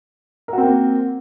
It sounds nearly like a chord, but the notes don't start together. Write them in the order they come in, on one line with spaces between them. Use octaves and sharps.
A#4 F#4 C4 A#3